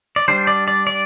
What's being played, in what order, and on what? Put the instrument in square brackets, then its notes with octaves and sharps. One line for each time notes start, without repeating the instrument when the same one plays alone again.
[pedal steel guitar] D5
G3 D4 C5
D5
D5
D5